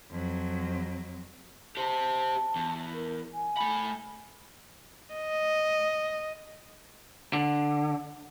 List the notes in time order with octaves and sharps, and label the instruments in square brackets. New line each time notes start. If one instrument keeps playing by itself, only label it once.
[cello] F2 F#3
[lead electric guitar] G4 C5 [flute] A5
[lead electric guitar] E2
[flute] A#4
G#5
[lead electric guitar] A3 B5
[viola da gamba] D#5
[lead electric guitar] D3